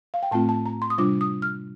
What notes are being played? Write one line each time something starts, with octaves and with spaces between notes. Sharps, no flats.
F5
G5
A2 A3 C4 F4 A5
A5
A#5
C6
D#6
C3 G3 D4 F4 D6
D#6
F6